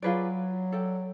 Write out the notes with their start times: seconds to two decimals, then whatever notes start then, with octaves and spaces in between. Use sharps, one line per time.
0.02 F#3 F4 G#4 B4 D5
0.72 A4 D5 G5